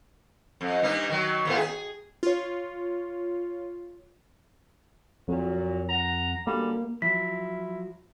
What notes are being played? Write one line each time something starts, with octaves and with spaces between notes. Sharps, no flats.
F2
G2 A#3 D#4
D#3 F#3
D#2 A2 B3
G#4
F4 C#5
F2 A#2 F#3
F#5 A#5
F#2 D3 G3 A#3
F3 F#3 E4 B6